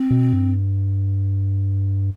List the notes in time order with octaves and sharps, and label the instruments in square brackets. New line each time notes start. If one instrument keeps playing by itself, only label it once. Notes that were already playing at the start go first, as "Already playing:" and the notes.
Already playing: [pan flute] C4
[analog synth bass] B2
G2